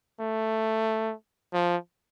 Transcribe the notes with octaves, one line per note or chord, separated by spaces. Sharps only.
A3
F3